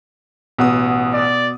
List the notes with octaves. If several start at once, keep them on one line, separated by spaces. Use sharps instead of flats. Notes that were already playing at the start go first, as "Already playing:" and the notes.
A1 B2 B3 F#5 D#6
D5